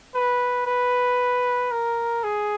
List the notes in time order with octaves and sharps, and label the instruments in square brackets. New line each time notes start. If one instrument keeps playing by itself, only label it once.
[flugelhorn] B4
B4
A#4
G#4